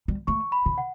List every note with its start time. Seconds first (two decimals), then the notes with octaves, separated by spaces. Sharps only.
0.08 G3
0.27 A3 C#6
0.52 B5
0.66 C#3
0.78 F#5